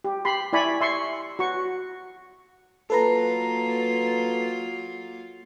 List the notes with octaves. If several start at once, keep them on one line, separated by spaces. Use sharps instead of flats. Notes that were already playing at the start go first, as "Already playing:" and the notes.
G4
G4 B5 C6
E4 D5 G#5 B5 C#6
E5 C6 C#6
F#4 C#6
F#3 A#3 F4 A4 B4 A#5